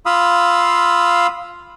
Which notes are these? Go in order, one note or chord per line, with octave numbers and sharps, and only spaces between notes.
F4 F5 B5 D#6 E6